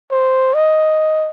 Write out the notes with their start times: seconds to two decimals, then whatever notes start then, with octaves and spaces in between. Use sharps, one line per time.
0.12 C5
0.54 D#5